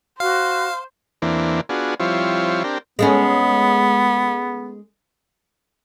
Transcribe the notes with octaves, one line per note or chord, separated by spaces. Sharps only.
F#4 C5 F5
E2 E3 A#3 C4 D4
B3 D4 F4 F#4 G#4
F3 G3 C4 E4 F4 C#5
C4 D4 G4 A#4
G#3 A3 B3 C#4